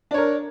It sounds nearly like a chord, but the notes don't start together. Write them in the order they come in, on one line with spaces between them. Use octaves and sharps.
D4 C#5 A#4